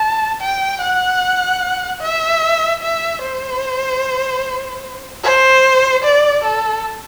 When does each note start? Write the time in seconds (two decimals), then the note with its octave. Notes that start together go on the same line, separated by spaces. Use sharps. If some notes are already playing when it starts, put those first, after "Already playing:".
Already playing: A5
0.41 G5
0.81 F#5
2.01 E5
2.82 E5
3.22 C5
5.24 C5
6.04 D5
6.44 A4